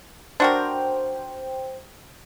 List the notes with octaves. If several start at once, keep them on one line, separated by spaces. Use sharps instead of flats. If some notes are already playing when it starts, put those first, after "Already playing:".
D4 F#4 A#4 C5 G5